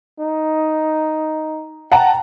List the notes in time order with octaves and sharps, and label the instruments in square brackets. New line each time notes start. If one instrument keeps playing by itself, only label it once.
[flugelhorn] D#4
[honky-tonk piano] F#5 A5 A#5 [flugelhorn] G5